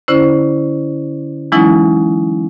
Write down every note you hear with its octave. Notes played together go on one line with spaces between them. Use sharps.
D3 C#4 E4 C5
E3 F#3 G#3 C#4 D#4 E4